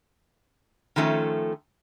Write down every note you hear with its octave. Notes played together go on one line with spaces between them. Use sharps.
D#3 F3 A3 C#4